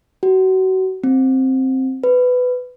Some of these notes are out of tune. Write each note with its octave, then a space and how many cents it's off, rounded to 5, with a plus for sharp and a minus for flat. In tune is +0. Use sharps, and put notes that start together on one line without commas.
F#4 +30
C4 +5
B4 +15